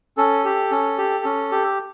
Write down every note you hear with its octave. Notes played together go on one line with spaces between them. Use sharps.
C#4 A4
G4
C#4
G4
C#4
G4